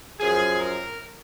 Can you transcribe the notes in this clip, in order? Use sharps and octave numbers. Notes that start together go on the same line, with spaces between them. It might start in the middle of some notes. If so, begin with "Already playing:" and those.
F#2 F3 G#4
A#4